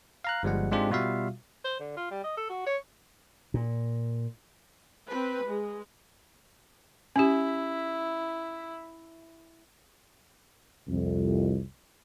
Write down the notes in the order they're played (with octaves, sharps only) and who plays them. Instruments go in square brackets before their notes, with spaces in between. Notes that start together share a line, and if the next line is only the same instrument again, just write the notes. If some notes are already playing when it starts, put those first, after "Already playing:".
[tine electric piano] F5 A#5 F#6
G1 F3 G3 G#3 F#5
G#2 G#3 C4 D4 F4 G4
B2 G3 F4 F#4 E5 F5
[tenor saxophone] C5
D3
F4
G3
D#5
A4
F#4
C#5
[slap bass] A#2
[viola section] C4 B4
G#3
[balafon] C#4 G4 [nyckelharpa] E4
[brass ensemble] C2 F2